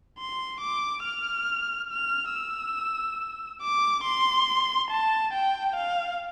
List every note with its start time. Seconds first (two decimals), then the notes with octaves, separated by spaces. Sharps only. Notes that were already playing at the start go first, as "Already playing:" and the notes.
0.18 C6
0.61 D6
1.04 F6
1.90 F6
2.32 E6
3.62 D6
4.04 C6
4.91 A5
5.34 G5
5.76 F5